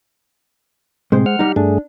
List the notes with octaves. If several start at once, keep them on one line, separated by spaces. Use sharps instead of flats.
A2 C3 G#3 C4 C5
F#5 F6
G3 D#4
G2 A3 D4 G#4